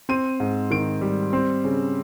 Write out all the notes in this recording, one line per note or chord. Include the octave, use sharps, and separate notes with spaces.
C4 D#7
G#2
D#3 D7
G3
C4
C#3